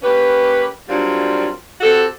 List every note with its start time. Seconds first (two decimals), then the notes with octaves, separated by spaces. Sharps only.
0.02 A#3 C#4 G4 B4
0.88 F#3 G3 A#3 C4 D4 F4
1.81 C4 F#4 G4 A4